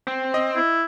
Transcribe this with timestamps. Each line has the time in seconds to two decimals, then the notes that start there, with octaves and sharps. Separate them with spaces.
0.07 C4
0.34 D#5
0.56 E4